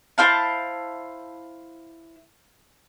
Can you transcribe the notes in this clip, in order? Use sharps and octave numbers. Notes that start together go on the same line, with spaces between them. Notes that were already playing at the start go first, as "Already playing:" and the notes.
E4 C5 F5 A5